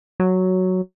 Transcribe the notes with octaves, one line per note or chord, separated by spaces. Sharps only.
F#3